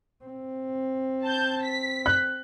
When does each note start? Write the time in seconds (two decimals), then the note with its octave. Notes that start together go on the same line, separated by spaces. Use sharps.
0.25 C4
1.23 A5 G6
1.63 B6
2.06 F#6